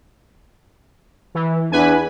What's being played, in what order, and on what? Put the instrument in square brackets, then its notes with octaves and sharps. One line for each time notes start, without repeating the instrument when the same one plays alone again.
[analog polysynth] E3
[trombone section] E2 D4 [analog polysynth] B4 G#5